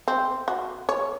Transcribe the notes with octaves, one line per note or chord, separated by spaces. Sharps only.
C4
F#4
C#5